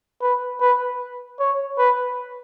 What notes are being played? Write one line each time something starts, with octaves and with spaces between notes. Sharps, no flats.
B4
B4
C#5
B4